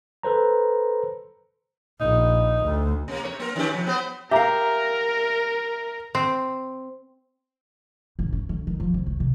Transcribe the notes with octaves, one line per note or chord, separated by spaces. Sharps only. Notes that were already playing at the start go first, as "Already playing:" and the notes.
A4 B4 C5 A#5
A#1 D#4
D2
C3 A#3
C3 B4 C#5
A#3 A#4
D#3 C#4 G4
C3 F3
B3 G4 C5
G4 A#4 E5 F5 A#5
C4
G#1
C#4
D3
D#3
F3
C2
A3
C3